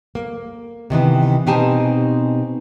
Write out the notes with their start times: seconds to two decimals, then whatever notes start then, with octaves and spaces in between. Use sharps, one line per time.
0.15 A#3
0.90 C3 D#3 E3 B3
1.47 B2 C4 D#4 G4 G#5 A5